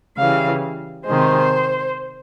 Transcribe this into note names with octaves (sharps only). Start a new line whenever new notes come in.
C#3 E3 G3 F5
C3 D#3 G#3 C5